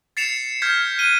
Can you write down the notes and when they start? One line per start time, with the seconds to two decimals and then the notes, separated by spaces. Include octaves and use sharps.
0.17 A6 C7 C#7 E7 F7
0.62 F6 G6 G#6 B6
0.98 F#6 D#7 G7